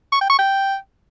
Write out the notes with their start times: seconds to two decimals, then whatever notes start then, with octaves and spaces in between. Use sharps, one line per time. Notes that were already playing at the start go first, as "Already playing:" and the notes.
0.12 C#6
0.21 G5
0.30 C#6
0.39 G5